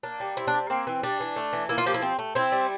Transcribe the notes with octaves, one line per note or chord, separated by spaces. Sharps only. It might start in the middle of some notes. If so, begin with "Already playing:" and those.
A#3 D4
G3
C4 E4
D4
G3
A#3 C4
E3
G3 D4
E3
A3
E3
A#3 E4
F4
F3 G4
E4
C4
A3
C4 E4
G3